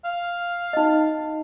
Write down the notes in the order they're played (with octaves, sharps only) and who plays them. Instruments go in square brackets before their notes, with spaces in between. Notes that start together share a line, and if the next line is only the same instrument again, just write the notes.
[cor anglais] F5
[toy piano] D#4 D#5